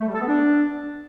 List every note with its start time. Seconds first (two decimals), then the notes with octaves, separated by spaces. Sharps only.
0.01 A3
0.08 G3
0.14 A4
0.21 B3
0.28 D4